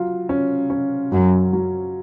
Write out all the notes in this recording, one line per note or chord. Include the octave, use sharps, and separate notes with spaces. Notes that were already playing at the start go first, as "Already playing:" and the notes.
Already playing: F#3 F4
C#4
C#4
F#2 F#3
F#3